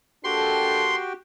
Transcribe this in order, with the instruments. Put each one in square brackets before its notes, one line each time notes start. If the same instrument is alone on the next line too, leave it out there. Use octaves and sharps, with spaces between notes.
[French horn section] A#3 D4 A4 [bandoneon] F#4 G4 G5 [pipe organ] C6